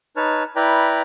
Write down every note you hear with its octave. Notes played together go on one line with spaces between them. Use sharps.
D#4 B4 C#5 A5 F6
E4 B4 D5 G5 A#5 B5